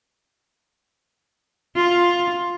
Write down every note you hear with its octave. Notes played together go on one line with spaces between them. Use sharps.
F4